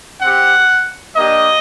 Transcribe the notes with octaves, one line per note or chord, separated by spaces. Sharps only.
C4 G4 F#5
A#3 D4 G4 D#5